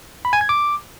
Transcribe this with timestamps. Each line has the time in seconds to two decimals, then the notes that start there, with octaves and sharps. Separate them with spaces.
0.25 B5
0.33 G#5
0.41 G#6
0.49 D6